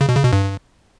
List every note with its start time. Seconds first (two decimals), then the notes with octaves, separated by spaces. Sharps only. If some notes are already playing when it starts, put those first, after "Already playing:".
0.01 C#3
0.09 B2
0.17 C#3
0.25 B2
0.33 G2